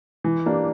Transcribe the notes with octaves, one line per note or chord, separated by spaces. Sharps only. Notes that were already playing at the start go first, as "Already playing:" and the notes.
E3
A#3 D4 G4